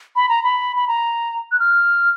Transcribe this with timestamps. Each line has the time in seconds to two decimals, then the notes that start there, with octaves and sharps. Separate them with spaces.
0.16 B5
0.29 A#5
0.44 B5
0.76 B5
0.88 A#5
1.52 F#6
1.60 F6